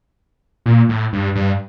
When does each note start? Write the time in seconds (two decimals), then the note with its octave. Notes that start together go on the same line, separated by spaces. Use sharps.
0.66 A#2
0.89 A2
1.13 G2
1.35 G2